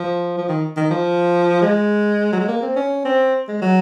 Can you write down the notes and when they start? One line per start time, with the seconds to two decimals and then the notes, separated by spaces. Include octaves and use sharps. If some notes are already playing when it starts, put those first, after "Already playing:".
Already playing: F3
0.38 F3
0.49 D#3
0.77 D#3
0.91 F3
1.62 G#3
2.33 F#3
2.40 G#3
2.48 A#3
2.62 C4
2.76 C#4
3.05 C4
3.48 G#3
3.62 F#3